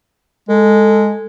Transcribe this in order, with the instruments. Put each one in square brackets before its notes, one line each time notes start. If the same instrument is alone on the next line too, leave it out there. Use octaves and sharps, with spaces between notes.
[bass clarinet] G#3 [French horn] A4